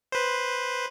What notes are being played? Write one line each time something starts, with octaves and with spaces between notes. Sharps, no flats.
B4 C5